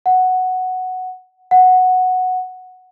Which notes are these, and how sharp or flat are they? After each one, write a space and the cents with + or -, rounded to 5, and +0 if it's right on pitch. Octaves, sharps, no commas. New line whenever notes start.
F#5 +0
F#5 -5